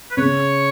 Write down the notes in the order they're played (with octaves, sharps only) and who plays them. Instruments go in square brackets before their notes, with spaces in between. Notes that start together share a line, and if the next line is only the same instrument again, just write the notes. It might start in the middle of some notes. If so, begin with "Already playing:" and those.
[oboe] B4
[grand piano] C#3 [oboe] C#5